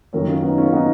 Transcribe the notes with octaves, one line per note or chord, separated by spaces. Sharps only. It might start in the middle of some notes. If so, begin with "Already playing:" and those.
F#2 D#3 F#3 A#4 C#5
C#4 F4
B3 D#4
C#4 F4
B3 D#4